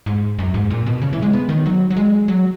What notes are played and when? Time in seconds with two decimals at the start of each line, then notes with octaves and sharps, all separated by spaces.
0.06 G#2
0.39 F#2
0.54 G#2
0.70 A#2
0.86 B2
1.02 C#3
1.13 E3
1.22 G#3
1.33 B3
1.49 D#3
1.66 F#3
1.90 F#3
1.97 G#3
2.28 F#3